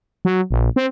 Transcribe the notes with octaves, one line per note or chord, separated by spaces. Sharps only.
F#3
A#1
C4